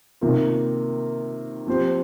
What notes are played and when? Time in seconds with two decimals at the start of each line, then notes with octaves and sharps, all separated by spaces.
0.21 C3 D#3 A#3 F4
1.66 F3 C4 G4 C5